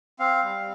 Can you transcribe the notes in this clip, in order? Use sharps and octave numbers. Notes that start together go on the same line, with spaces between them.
C4 F5
G3